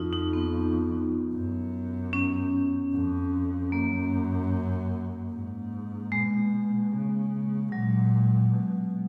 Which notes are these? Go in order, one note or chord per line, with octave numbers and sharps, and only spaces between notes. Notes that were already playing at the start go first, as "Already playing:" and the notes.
Already playing: F2 D#4 F4
D#4
B3
F#2
C#4
F2
F#2 A#3
G#2
B2 G#3
C#3
A#2 F#3
B2